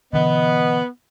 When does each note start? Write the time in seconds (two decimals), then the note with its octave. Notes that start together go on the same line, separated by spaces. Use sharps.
0.13 B2 D3 E3 B3 D#5